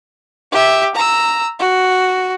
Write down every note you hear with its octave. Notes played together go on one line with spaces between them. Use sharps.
G4 E5
A#5 E6
F#4